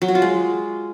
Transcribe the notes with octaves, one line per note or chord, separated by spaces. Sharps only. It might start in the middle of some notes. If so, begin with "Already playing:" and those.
F#3
F#4
F4
G#3